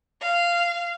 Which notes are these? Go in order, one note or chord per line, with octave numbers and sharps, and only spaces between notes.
F5